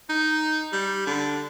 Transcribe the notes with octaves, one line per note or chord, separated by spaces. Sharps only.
D#4
G3
D3